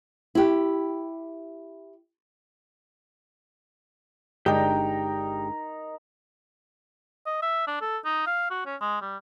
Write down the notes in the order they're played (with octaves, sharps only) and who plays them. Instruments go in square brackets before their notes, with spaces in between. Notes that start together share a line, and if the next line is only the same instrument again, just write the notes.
[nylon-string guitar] E4 G4
[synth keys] G1 G#3 D4 [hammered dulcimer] D#4 A#4 [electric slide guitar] G4 G5
[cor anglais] D#5
E5
D4
A4
D#4
F5
F#4
C#4
G#3
G3